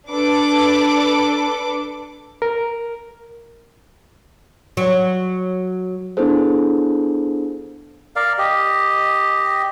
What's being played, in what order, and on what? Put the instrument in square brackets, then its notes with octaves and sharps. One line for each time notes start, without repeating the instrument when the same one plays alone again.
[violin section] D4 A4 B4 D6
[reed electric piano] A#4
[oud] F#3
[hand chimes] B3 D4 E4 G#4 A4 C5
[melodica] A#4 D5 F5
G4 D#5